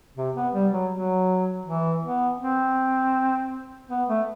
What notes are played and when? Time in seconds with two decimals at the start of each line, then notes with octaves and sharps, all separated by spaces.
0.17 C3
0.35 B3
0.54 G3
0.73 F#3
0.91 F#3
1.66 E3
2.03 B3
2.40 C4
3.90 B3
4.08 A3